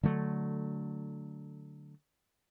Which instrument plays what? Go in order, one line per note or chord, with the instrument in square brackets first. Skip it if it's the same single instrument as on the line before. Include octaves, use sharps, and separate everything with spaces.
[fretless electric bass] D3 F#3 A3